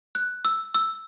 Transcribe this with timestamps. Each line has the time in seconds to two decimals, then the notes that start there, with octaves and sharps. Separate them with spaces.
0.15 F#6
0.45 E6
0.74 E6